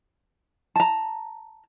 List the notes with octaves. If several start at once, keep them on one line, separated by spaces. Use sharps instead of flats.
A5 A#5